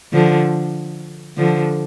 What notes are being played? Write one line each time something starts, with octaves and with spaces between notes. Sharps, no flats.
D3 F3
D3 F3